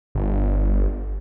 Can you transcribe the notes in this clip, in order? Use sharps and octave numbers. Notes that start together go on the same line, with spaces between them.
G1